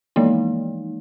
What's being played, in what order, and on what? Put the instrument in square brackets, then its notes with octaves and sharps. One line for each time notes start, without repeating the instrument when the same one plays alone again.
[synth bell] E3 F3 G#3 A#3 D#4